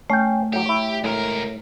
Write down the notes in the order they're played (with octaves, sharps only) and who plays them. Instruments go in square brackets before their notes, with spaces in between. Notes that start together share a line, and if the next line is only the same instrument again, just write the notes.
[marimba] A3 [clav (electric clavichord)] C#4 G5
[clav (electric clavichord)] A2 F#3 [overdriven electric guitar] G4
[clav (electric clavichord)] E4 C#5
[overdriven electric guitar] C#2 A#4 [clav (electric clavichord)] A2